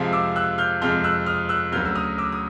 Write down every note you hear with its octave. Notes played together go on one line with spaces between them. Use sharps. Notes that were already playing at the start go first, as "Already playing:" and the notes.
Already playing: F2 C3 F3 G#3
D6 E6
E6 F#6
F6 G6
F2 C3 F3 G#3 F6 G6
E6 F#6
D#6 F6
E6 F#6
D2 C#3 F#3 F6 G6
E6
D#6 F6
D6 E6
D#6